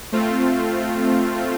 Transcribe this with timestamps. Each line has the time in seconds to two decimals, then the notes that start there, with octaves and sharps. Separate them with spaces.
0.12 A3 C4 F4